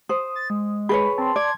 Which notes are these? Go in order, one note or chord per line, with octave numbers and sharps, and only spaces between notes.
C5 D#6
A6
G#3
G#4 B4 C#5 B5
C4 A5 C6
D5 G#6